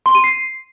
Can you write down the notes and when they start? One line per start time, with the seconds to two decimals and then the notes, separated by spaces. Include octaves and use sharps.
0.06 C6
0.15 D#7
0.24 C7